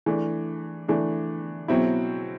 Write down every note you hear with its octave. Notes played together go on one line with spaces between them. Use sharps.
E3 A3 D4
E3 A3 D4
B2 F#3 C4 E4